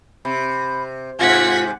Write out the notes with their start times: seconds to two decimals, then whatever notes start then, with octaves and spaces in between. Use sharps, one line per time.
0.25 C3 B5
1.19 G#2 C3 F4 F#5 G#5 G#6 B6